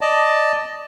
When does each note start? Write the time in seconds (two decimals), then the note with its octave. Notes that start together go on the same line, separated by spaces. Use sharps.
0.01 D5 D#5 A5